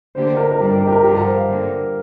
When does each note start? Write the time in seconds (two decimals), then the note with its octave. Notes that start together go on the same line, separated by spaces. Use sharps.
0.15 D3 A#3 G4 C5
0.37 A#4
0.51 A#4
0.59 G2 G3 D4 G4
0.70 G4
0.81 A#4
0.87 G4
0.92 A#4
1.03 G2 D3 F3 G4
1.14 A#4
1.25 C5
1.36 F5
1.47 G2 D3 A#3